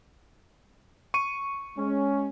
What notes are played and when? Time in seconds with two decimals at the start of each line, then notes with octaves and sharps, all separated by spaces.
1.14 C#6 D#7
1.77 G#3 C#4